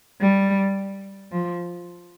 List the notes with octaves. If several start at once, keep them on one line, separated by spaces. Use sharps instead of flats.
G3
F3